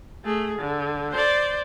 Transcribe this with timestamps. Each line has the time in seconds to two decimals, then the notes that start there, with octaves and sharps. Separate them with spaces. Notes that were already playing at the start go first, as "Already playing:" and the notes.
0.24 A3 G#4
0.58 D3
1.11 C5 D5